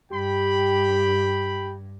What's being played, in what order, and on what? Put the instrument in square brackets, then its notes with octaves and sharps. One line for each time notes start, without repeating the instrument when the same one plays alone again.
[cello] G2 [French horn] G4 [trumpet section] G5 B5